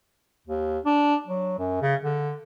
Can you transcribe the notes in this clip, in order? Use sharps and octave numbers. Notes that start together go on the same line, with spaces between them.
D#2
D4
F#3
F#2
C#3
D3